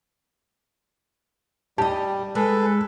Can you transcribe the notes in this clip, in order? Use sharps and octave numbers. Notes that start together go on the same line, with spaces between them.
G3 G4 D#5 A5
G#3 A4 B4